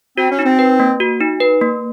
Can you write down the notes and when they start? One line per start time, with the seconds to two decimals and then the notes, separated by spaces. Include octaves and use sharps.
0.18 C4 F#4
0.31 C#4
0.39 D#4
0.45 C4
0.59 B4
0.80 A#3
1.00 F#4
1.21 D#4
1.41 B4
1.62 A#3